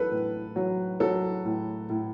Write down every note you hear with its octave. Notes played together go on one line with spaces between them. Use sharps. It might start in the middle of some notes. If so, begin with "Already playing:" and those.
Already playing: F#3 A4 B4
A2
F#3
F#3 A4
A2
A2